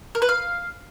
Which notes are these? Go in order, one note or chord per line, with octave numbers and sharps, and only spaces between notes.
A#4
B4
F5